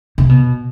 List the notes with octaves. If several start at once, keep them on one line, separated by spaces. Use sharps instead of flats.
C3
B2